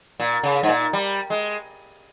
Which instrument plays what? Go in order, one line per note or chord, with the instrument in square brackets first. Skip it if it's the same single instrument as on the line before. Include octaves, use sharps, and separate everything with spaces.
[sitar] A#2
C#3
G#2
A#2
G3
G#3